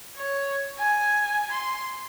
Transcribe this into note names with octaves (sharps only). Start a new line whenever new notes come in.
C#5
G#5
C6